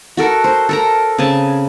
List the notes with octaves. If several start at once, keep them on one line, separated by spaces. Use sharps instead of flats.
F#4 A4 A#4
C5
A4 A#4 A#5
C#3 C4 G#5 A5